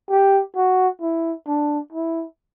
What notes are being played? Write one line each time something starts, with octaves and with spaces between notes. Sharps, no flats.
G4
F#4
E4
D4
E4